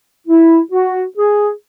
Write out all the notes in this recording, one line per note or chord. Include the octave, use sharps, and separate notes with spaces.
E4
F#4
G#4